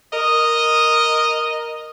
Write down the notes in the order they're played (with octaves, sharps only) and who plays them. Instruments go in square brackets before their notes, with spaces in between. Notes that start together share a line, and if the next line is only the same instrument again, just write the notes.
[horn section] A#4 D#5